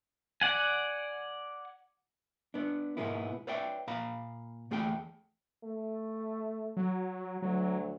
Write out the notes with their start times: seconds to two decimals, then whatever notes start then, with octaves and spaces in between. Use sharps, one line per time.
0.41 D5 F#5 G#5
2.54 B3 D4
2.97 G#2 B2 G#3 A#3 B3 E4
3.47 B4 C#5 D5 E5 F#5 G5
3.87 A#2 F5 A#5 B5
4.71 E2 A3 G#4 F#5 G5
5.64 A3
6.77 F#3
7.42 D2 F#3